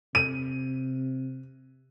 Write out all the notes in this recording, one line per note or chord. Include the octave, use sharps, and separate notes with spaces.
C3 D#7